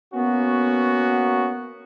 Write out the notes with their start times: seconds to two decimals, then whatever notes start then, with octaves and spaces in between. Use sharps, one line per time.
0.14 A#3 B3 C#4 F#4